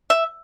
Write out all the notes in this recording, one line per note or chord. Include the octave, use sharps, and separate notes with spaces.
E5